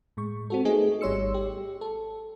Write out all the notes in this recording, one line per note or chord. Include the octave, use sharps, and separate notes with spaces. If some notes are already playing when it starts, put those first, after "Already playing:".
A2 G#3 C#6
C4 F#4 A4
A3 B3 D#4 G#4 D#5
G#1 G3 C#5 C6 E6 C#7
G4
A4